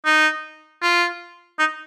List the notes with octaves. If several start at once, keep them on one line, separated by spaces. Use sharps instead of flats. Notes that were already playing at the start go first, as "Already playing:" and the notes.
D#4
F4
D#4